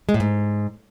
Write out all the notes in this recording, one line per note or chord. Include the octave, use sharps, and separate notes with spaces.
G#3
A2
G#2